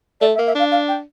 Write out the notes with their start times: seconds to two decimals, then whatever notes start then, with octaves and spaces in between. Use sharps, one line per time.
0.21 A3 D5
0.35 E5
0.38 A#3
0.47 E5
0.55 D4 F5
0.71 F5
0.88 G5